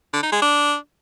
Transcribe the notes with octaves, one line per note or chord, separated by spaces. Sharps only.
D3
D#4
G#3
D4